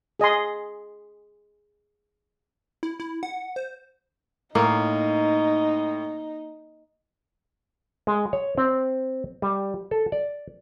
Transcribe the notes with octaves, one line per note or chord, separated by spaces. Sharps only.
G#4 D#5 G#5 C6
E4
E4
F#5
C5
A2 A#3 D#4
G#3
C#5
C4
G3
A4
D5